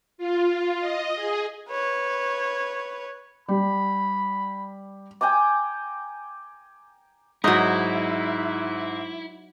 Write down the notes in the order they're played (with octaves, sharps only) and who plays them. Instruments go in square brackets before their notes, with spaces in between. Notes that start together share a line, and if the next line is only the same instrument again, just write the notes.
[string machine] F4
D#5
G#4
[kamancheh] B4 C#5
[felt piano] G3 [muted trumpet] B5
[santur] G5 G#5 A#5 D6
[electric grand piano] G#2 [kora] F#3 D#4 [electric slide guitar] E4